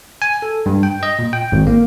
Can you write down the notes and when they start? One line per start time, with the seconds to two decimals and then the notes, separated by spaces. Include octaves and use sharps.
0.22 G#5
0.42 A4
0.66 G2
0.83 G5
1.03 D#5
1.19 A#2
1.33 G5
1.52 G#1
1.67 A#3